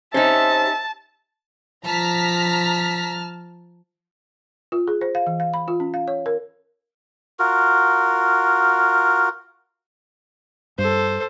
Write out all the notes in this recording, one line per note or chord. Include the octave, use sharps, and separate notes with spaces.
C#4 D#4 G4 C5 E5 A5
F3 A5 A#5 F6 A#6 B6
F4
G#4
C5
F5
E3
F5
B5
F4
C#4
F5
C#5
A#4
F4 F#4 A#4
G2 A4 C5